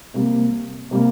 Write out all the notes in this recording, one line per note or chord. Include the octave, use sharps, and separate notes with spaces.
C3 G3 A#3
C3 G3 A#3